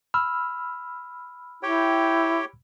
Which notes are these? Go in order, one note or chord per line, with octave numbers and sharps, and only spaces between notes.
B5 E6 F6
E4 G4 C#5 G5